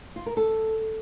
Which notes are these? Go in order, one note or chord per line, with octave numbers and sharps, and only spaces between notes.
F4
A#4
A4